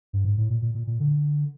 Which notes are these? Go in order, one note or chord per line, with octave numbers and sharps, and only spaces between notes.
G2
G#2
A2
A#2
A#2
A#2
A#2
D3